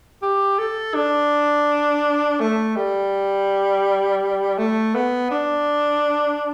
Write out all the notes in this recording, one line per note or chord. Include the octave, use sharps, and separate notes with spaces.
G4
A4
D4
A3
G3
A3
B3
D4